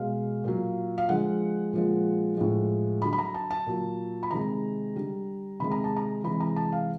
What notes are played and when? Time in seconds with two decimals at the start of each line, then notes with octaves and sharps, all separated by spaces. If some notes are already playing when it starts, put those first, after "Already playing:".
Already playing: B2 G#3 F5
0.44 A#2 F#3
0.98 F5
1.08 D3 F3 G#3 F#5
1.73 A#2 F3 G#3
2.37 A2 F3 G#3
3.02 D3 F#3 B5
3.13 B5
3.19 A#5
3.34 A5
3.51 A5
3.67 A#2 F#3
4.23 B5
4.31 C3 D#3 G#3 A#5
4.96 D3 G3
5.60 C3 D#3 G#3 B5
5.71 A#5
5.84 A5
5.96 A#5
6.24 C3 E3 G#3 B5
6.40 A#5
6.56 A5
6.72 F5